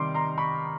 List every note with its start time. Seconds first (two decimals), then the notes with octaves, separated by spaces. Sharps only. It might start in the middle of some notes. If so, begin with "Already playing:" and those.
Already playing: C3 D#3 G3 C6 D6
0.14 A#5 C6
0.38 B5 C#6